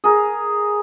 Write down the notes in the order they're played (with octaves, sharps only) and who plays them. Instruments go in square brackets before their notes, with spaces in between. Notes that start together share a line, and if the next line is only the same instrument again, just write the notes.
[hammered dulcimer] G#4 A#4